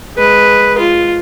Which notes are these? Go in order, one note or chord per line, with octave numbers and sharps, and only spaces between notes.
G#3 B4
F4